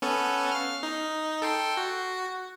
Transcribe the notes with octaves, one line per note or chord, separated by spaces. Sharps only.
B3 C#4 A4
F5 F6
D#4
A4 G5 C6
F#4